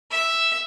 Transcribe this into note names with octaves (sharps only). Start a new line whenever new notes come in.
E5